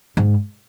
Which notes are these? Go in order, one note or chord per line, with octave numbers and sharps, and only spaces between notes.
G#2